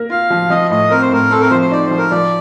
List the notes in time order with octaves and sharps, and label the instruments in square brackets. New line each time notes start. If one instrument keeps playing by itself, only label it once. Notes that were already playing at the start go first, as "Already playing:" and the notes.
Already playing: [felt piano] A#3 A#4
[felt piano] F4 [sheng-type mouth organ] F5
[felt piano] F3
[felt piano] F3 [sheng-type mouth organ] D#5
[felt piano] A2 [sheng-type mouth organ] D#5
[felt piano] C4 [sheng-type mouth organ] A#4
[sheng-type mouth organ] C5
[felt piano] A2 [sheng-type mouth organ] A#4
[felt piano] C4 [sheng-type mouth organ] A4
[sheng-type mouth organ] A#4
[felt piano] F3 [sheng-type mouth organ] C5
[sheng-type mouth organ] C5
[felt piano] D#4 [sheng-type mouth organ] D5
[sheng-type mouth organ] C5
[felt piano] F3
[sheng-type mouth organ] A#4
[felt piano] F3 [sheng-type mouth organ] D5